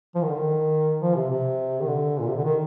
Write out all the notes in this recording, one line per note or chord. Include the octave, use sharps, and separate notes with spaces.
F3
D#3
D3
D#3
F3
C3
C3
D#3
D3
A#2
C3
D3
D#3